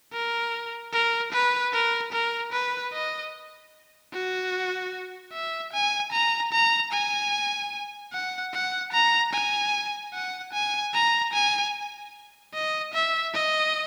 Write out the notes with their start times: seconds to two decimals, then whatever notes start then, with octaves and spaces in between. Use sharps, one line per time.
0.13 A#4
0.93 A#4
1.33 B4
1.73 A#4
2.13 A#4
2.53 B4
2.93 D#5
4.13 F#4
5.33 E5
5.73 G#5
6.13 A#5
6.53 A#5
6.93 G#5
8.13 F#5
8.54 F#5
8.93 A#5
9.33 G#5
10.13 F#5
10.53 G#5
10.94 A#5
11.33 G#5
12.54 D#5
12.94 E5
13.34 D#5